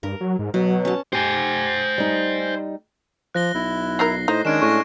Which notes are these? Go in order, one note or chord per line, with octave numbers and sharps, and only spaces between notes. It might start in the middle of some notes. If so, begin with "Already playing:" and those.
G2 A#4
F#3
G#2
B2 F#3
C#4 A5
G4 C5 G#5
G3 D#4
F3 F#6 A#6 G7
B1 E4
F#3 D#4 A#4 A#6 C7
A2 D#4 C5 D#5
D#3 G#3 C#4 D4 G#6 D7 E7
A2 C#6 A#6